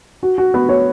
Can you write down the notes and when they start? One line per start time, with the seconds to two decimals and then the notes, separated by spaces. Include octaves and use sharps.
0.23 F#4
0.38 F#4
0.54 B3
0.69 C#5